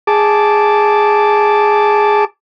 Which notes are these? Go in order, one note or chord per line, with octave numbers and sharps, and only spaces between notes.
G#4 A5 D6